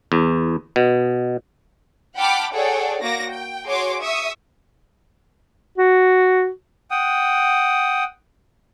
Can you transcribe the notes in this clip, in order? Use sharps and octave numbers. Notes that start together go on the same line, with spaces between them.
E2
B2
F#5 G5 A5 B5 D6 F6
G#4 A4 C#5 D5 F#5 G5
A#3 F#4 D6 A#6
G5
F#4 G#4 C#5 C6 D6
E5 C#6 D#6
F#4
F#5 G5 D#6